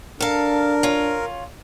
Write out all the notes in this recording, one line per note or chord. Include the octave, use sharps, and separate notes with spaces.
D4 A4 A#4 F5
C#4 F4